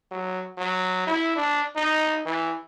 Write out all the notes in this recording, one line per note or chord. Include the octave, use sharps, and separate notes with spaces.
F#3
F#3
E4
D4
D#4
E3